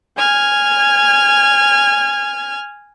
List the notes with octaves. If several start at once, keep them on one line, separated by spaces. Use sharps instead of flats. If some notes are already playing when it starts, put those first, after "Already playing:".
G#5 F6 G#6